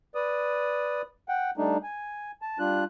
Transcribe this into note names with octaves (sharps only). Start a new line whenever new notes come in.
B4 D5 D#6
F#5 G5
G3 A3 D4 D#4
G#5
A5
G3 D4 F4 F#6